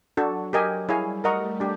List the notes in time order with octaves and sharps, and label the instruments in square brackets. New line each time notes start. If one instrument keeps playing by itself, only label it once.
[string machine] F#3 [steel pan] D4 F#4 A4
[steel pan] G4 A#4 D#5 G#5
[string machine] G3 [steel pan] E4 G#4 C#5 F5 G#5
[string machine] A3 [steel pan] A#4 D#5 F#5 A#5 C#6
[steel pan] D4 G4